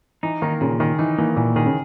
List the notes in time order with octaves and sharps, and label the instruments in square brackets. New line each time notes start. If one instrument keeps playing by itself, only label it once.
[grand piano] E3 [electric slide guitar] D#4
[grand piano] D#3 [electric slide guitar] A#3
[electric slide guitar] A#2 [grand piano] C#3
[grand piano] D#3 [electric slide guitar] G#4
[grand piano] E3 [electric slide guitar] D#4
[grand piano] E3 [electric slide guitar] A#3
[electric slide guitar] A#2 [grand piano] E3
[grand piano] D#3 [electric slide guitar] G#4
[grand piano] C#3